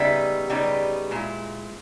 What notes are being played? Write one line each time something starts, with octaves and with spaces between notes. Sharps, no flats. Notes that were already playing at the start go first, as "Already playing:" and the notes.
Already playing: C#3 G3 B3 D#4 E5
C#3 G3 B3 D#4
A#2 G#3 E4